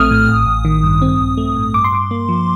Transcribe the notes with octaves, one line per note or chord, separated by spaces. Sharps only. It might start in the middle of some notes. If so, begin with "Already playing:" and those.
Already playing: A#1 A3 C4 D#6 F6
A2
A1
A1
D#3
G2
C4
A#1
A3
A2
G2 D6
C6
G2 D6
A#3
F3